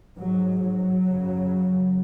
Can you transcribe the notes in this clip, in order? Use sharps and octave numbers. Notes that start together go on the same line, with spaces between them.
G#2 F#3
F#3
F#2 C#3